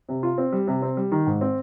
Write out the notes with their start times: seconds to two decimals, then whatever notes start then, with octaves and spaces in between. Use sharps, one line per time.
0.09 C3
0.23 F4
0.38 C4
0.52 G3
0.67 C3
0.82 C4
0.97 G3
1.12 D#3
1.27 G#2
1.41 C4